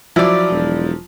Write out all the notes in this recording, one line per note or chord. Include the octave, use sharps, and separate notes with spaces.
F3 F#3 E4 D5
E1